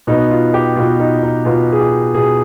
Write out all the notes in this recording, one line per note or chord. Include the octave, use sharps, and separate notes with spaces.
B2 B3 D#4
F4
G4
B2 B3 F4
D#4
D#4
B2 B3 F4
G#4
G4
B2 B3 G#4